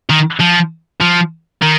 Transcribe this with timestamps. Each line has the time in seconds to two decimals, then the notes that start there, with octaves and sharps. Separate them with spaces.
0.10 D#3
0.40 F3
1.01 F3
1.62 D#3